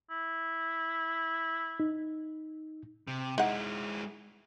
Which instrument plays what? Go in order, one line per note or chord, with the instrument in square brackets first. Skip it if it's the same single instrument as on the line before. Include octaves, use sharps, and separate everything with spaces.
[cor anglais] E4
[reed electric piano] D#4
[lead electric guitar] C3
[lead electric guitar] G#3 E4 [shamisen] D#4 F#5